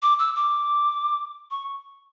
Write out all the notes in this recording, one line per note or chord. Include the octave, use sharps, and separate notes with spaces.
D6
E6
D6
C#6